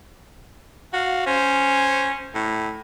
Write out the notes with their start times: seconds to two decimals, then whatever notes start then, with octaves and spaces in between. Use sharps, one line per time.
0.93 F#4 F5
1.26 C#4 C5
2.34 A2